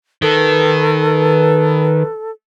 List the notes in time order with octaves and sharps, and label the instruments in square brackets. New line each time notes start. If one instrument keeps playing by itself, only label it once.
[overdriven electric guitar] D#3 [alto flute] A4 [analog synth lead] B4